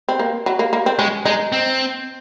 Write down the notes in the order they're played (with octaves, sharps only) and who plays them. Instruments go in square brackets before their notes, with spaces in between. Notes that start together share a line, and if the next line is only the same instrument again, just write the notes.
[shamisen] C4
A#3
F#3
A#3
A#3
C4
[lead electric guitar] G#3 [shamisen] C#4
[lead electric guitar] G#3 [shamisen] D#4
[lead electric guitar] C4